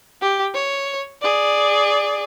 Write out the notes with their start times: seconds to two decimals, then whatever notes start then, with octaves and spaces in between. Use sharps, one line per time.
0.22 G4
0.54 C#5
1.22 G#4 D5